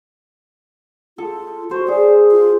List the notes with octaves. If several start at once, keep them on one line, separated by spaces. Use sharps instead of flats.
F4 A4
F#4 C5
G#4 D5
F4